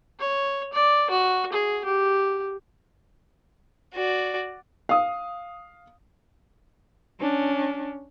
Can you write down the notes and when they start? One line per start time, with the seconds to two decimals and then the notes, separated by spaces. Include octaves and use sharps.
0.20 C#5
0.73 D5
1.10 F#4
1.53 G#4
1.85 G4
3.93 F#4 D5
4.89 F5 D#6
7.20 C#4 D4